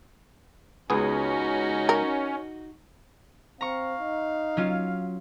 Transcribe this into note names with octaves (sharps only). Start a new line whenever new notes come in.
C#2 B3 C#4 D#4 F#4 G#4
A#4
C4 F5 A#5 C#6
D#4
F#3 C#4 F4